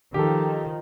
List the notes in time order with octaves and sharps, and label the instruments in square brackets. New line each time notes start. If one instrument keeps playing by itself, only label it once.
[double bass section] D#3 F3 [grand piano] G4 A4